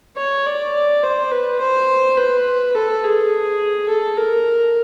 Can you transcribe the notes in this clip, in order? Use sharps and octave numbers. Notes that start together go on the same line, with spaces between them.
C#5
D5
C5
B4
C5
B4
A4
G#4
A4
A#4